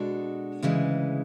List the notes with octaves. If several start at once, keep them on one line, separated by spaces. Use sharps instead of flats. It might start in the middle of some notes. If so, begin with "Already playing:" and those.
Already playing: B2 G#3 D4 F#4 A4
D2 C#3 E3 G#3